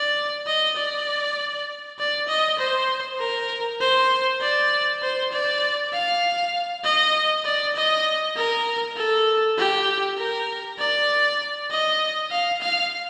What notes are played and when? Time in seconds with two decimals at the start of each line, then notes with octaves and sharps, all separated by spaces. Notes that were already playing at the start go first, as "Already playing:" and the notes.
Already playing: D5
0.47 D#5
0.76 D5
1.99 D5
2.28 D#5
2.59 C5
3.20 A#4
3.80 C5
4.41 D5
5.02 C5
5.32 D5
5.93 F5
6.84 D#5
7.45 D5
7.75 D#5
8.36 A#4
8.97 A4
9.58 G4
10.18 A#4
10.79 D5
11.70 D#5
12.31 F5
12.61 F5